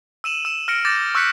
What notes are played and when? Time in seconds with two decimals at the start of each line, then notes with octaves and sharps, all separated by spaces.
0.24 E6 D#7 E7 F#7
0.45 E6 E7
0.68 F6 A#6 C#7 D7
0.85 D6 G6 A6 A#6 E7
1.15 C#6 E6 F#6 G6 B6 C#7